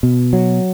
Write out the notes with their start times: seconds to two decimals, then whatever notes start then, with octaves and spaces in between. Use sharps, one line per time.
0.03 B2
0.33 F#3